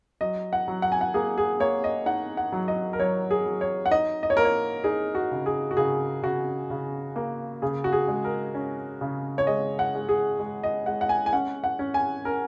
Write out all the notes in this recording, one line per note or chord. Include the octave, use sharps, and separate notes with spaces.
F#3 D#5
F#5
F#3
F#5
G#5
F#5
A#3 G#4
G#4
A#3 C#5
D#5
D#4 F#5
F#5
F#3
D#5
A#4
F#3 C#5
G#4
F#3
C#5
F#5
D#4 D#5
D#5
C#5
A#3 A#4
C#5
D#4 G#4
F#4
C#3
G#4
F#4
C#3 G#4
C#3 F#4
C#3
A#3
C#3 G#4
F#4
G#4
G#3
A#4
C#4
C#3
C#5
G#3 D#5
F#5
G#3
G#4
G#3
D#5
G#3 F#5
F#5
G#5
G#5
C#4 F#5
F#5
C#4
G#5
C#4 A#4